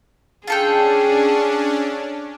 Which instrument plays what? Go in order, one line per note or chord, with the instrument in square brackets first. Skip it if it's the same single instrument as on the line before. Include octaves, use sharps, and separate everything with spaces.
[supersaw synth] C#4 D4 [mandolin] F4 A4 G5 [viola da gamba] G#4